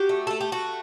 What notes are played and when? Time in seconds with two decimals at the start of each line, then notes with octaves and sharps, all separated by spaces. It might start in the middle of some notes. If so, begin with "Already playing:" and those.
Already playing: F#3 G4
0.09 A3
0.27 A3 A4
0.41 G4
0.52 A3 F#4